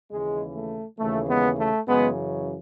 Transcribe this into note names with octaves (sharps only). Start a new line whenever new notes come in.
D#2 C#3 E3 G#3
A3
D#2 C#3 E3 A3
G#3 B3
A3
F#2 C#3 E3 G#3 B3